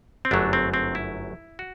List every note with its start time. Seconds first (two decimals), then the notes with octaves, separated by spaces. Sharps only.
0.25 C4
0.31 G1 F#2 F#3 A3 D4
0.53 C4
0.74 C4
0.95 E4
1.59 F#4